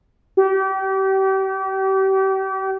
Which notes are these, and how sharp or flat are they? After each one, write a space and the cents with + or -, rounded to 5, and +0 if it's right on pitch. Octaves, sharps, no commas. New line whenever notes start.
G4 -35